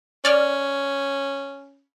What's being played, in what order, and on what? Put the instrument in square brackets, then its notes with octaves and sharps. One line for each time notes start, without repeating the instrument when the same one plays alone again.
[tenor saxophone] C#4 [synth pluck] D5 F6